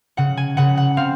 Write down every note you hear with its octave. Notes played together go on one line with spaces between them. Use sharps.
C#3 F#5
G#5
C#3 F#5
F#5
C4 F5